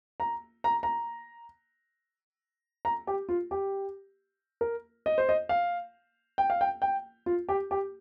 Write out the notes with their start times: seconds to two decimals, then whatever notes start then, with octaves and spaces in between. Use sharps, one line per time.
0.20 A#5
0.64 A#5
0.83 A#5
2.85 A#5
3.07 G4
3.29 F4
3.51 G4
4.61 A#4
5.06 D#5
5.18 C5
5.29 D#5
5.49 F5
6.38 G5
6.50 F5
6.61 G5
6.82 G5
7.26 F4
7.49 G4
7.71 G4